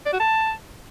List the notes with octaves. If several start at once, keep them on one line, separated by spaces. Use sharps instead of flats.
D5
F#4
A5